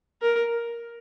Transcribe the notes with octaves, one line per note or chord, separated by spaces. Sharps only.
A#4